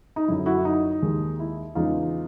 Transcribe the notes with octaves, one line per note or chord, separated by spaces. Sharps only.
D#4
F#2 D3 F#3 E4
E4 F#4
D#4
D#2 D#3 G#3
E4
E2 C#3 E3 G#3 D#4 F4